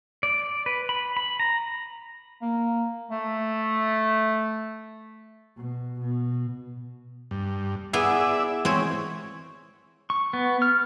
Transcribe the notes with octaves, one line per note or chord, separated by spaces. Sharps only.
D5
B4
B5
B5
A#5
A#3
A3
B2
B2
G2
B3 E4 G#4 D5 E5
E3 G#3 C4 C#5
C#6
B3
F6